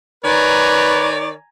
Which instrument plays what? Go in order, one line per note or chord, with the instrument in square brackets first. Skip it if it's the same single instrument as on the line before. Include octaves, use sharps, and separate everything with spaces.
[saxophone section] D#3 C#5 D5 [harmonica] B4 [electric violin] G#5 A#5